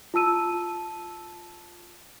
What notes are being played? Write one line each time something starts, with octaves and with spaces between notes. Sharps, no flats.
F4 A5 E6 D#7